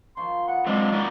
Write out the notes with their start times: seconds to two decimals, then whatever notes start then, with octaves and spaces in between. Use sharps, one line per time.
0.17 D#3 F3 C6 C#6
0.48 B3 F#5
0.66 A#2 F#3 G#3 C4 D4
0.92 C#4 D#4 F#4 D5